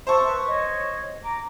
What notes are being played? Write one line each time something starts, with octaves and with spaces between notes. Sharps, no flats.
C5 E5 A5 C#6 E6
B4
C#5 D#5
A#5 D6